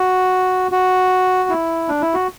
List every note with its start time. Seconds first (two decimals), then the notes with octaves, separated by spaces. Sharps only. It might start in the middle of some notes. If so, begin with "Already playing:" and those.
Already playing: F#4
0.72 F#4
1.49 E4
1.88 D4
2.01 E4
2.14 F#4